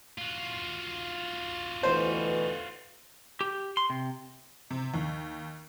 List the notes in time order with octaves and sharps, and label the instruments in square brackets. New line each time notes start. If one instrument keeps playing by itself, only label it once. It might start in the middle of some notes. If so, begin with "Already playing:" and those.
[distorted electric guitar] F4 F#4
[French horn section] D2 B2 E3 [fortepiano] C5
[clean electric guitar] G4
C6
C3
[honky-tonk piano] C3
D#2